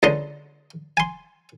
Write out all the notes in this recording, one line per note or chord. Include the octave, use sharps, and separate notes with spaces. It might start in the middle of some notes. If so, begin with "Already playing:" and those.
C#2 D3 D#5 C6
G#5 C6